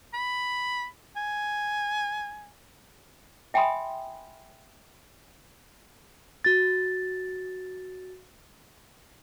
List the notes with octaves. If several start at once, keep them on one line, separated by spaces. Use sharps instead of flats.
B5
G#5
E5 G5 G#5 B5 C6 D#6
F#4 A6